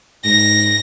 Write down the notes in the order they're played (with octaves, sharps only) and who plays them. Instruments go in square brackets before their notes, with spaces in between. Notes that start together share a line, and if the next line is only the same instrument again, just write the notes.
[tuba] G#2 [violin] A#6